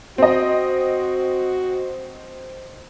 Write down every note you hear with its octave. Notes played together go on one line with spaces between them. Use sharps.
C4 F#4 D#5